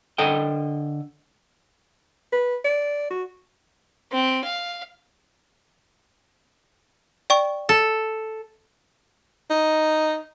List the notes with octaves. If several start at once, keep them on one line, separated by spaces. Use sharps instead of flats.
D3 A4 D#5 G5
B4
D5
F#4
C4
F5
D5 G5 C#6
A4
D#4